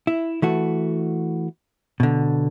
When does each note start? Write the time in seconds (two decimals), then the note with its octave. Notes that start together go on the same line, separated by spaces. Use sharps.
0.07 E4
0.42 E3 A3 F#4
2.00 B2 D3